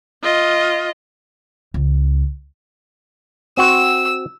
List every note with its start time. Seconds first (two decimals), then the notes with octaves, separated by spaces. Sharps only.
0.23 F4 D#5
1.74 C#2
3.57 C4 F#4 E6